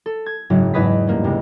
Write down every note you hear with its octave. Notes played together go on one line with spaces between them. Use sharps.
A4
G#6
F#1 G#2 C#3 F#3
E2 G#2 G#4 B4 D#5 B6
G2 A#3 C#4
C#2 C3